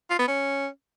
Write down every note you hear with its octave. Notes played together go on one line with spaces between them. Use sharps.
F4
B3
C#4